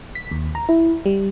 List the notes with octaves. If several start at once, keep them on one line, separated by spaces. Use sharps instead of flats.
B6
D#2
A#5
E4
G3